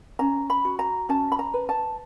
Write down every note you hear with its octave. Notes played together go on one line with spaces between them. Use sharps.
C#4 A#5
B5
F#4
A#5
C#4 A5
B5
A#5
B4
A5